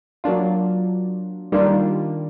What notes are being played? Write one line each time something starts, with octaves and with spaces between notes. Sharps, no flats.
F#3 A#3 D4 F4
D#3 G3 A#3 D4 F4